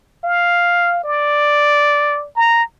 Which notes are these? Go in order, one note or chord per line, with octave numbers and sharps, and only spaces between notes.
F5
D5
A#5